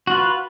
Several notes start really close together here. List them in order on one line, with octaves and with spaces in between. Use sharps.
F#4 F4 B4